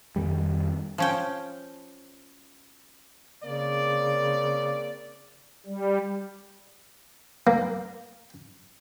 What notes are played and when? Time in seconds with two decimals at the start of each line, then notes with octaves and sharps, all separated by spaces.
0.16 F2 D#3 G3
0.98 F3 C#4 G5
3.44 C#3 A#3 C4 D5
5.66 G3
7.47 A#3